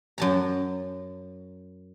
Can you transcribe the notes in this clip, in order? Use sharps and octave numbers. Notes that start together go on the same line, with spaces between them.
F#2 A5 A#5